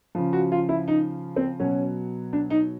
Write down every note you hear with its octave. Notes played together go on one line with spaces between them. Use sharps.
C#3 F3
F#4
F4
E4
D#4
C4
B2 F#3 C#4
D4
D#4